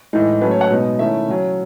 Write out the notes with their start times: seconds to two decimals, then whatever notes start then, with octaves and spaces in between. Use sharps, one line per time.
0.13 A2 E3 G#3 D#4
0.41 F#3 A3 C#4 B4
0.51 C#5
0.61 F#5
0.70 B2 G#3 B3 D#4
0.99 D#3 A3 C#4 E4 E5
1.28 C#3 F#3 C#4